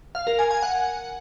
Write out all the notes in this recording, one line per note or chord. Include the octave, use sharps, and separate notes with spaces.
F5
A#4
G#5
G#5
F#5